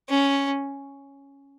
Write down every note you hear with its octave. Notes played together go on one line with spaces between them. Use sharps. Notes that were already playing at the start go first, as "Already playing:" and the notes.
C#4